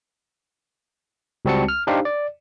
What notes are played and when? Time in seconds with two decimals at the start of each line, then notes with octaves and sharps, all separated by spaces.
1.45 C#2 G3 C4 F#4 A5 C#7
1.68 F6
1.87 D4 D#4 G4 C5 F5
2.05 D5